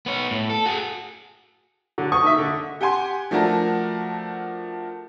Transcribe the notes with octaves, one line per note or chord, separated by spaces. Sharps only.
B3 C#5
A2
A4
F#4 G#4
D3 F#3
C#6 D#6
D#3 E5
D3
G4 F#5 G#5 C6
F3 A3 D4 F#4 A#4